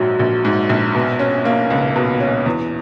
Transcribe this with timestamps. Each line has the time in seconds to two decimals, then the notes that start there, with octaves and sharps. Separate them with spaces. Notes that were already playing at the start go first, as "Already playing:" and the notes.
Already playing: A#1 G#2 F#3
0.19 A#1
0.45 G#2
0.70 A#1
0.95 B2
1.19 C#4
1.45 A#3
1.70 C#2
1.96 B2
2.20 C#4
2.46 E2